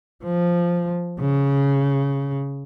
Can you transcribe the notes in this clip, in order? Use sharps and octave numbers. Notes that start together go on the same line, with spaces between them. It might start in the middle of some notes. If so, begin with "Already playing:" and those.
F3
C#3